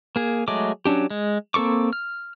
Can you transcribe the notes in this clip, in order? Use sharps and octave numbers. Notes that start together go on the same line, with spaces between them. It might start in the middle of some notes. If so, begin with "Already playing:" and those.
A#3 G#4
F#3 G#3 A3 G#4 D6
F#3 C#4 D4 G4
G#3
A#3 C4 A4 C#6 D6
F6